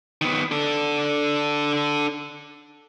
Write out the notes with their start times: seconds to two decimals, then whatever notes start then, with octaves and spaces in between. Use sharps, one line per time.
0.21 D#3 B3
0.52 D4 A4